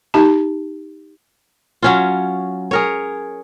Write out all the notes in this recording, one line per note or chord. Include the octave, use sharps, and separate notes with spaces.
D#4 G4 A5
F#3 C#4 F4
G#4 A#4 C#5